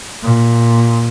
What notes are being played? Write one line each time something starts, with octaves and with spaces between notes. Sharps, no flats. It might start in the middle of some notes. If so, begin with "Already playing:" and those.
A#2